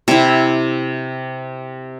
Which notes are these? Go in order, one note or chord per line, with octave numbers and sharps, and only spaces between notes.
C3 E4